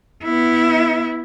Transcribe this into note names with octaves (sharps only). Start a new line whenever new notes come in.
B3 E4